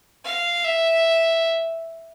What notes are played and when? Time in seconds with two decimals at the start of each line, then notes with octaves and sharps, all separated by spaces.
0.24 F5
0.65 E5